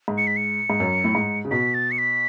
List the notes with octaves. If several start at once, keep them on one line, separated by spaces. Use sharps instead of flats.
G#2
C#7
B6
C#7
G#2
F#2
A2
G#2
C#3
B2 B6
A6
C#7
B6